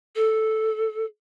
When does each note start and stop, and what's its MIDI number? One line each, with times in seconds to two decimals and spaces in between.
0.15 1.05 69